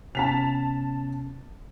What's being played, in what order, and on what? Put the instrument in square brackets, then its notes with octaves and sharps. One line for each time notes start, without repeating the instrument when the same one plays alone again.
[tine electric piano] C3 B3 C#4 [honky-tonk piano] A5 B6 F7